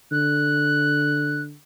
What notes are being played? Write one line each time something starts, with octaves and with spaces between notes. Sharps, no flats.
D3 F#6